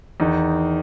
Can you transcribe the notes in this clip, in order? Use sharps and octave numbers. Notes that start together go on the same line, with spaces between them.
E2 D#3 D#4